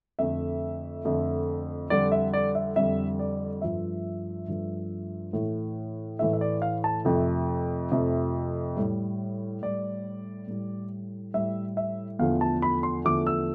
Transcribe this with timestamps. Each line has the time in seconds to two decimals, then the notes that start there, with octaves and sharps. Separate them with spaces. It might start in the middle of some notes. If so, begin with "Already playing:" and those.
0.19 F2 D3 A3 E5
1.05 F2 D3 A3
1.90 F2 D3 G3 D5
2.12 E5
2.33 D5
2.55 E5
2.76 F2 D3 G3 E5
3.19 D5
3.62 G2 F3 A3 E5
4.48 G2 F3 A3
5.33 A2 E3 A3
6.19 A2 E3 A3 E5
6.33 E5
6.41 D5
6.62 F5
6.84 A5
7.05 F2 C3 F3 A3
7.91 F2 C3 F3 A3
8.76 A2 G3
9.62 A2 G3 D5
10.47 A2 G3
11.34 A2 G3 E5
11.77 E5
12.19 E2 D3 F3 A3 F5
12.41 A5
12.62 B5
12.83 C6
13.05 E2 D3 F3 A3 D6
13.27 E6